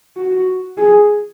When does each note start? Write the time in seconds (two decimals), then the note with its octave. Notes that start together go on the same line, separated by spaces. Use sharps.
0.17 F#4
0.77 G#4